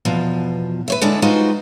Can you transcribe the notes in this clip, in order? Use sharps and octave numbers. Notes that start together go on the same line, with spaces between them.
E2 B2 F3
B4 C#5 E5
D3 G#3 C#4 D4 E4 A4
G#3 D#4 F4 F#4 B4 C5